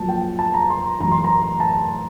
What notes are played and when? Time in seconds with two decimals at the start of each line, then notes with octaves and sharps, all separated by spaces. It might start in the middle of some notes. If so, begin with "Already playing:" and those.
Already playing: A#1 A#2 F#3 A5
0.08 G5
0.39 A5
0.54 A#5
0.70 C6
1.00 A1 A2 F#3 A#5
1.11 C6
1.24 A#5
1.60 A5